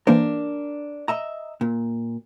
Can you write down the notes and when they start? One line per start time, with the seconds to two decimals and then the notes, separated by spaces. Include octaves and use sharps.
0.07 E3 A#3 D4 A#4 C5
1.08 D#5 E5 A#5
1.61 A#2